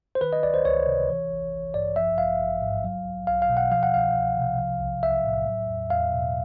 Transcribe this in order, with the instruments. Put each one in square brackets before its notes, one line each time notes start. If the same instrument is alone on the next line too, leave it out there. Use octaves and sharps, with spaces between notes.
[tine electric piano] C5
D#3 B4
D#5
C#2 D5
C5
C#2 C#5
C3
E3
A1
A1
G2 D5
F3 E5
A1 F5
A1
G#2
F#3
B1
B1 F5
F5
B2
F#5
F3 F5
F#5
C2 F5
C2
C3
F3
B1
B1 E5
A2
F#3
E2
E2 F5
B2